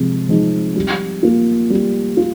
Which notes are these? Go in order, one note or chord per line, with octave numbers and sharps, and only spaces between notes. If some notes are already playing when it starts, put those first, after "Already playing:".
Already playing: C3 F3 G#3
F3 G#3 D#4
G3
A#3 F4
G3
F4